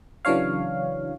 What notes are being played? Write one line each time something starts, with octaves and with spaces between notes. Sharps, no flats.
C#3 E3 F#3 D4 C#5 F5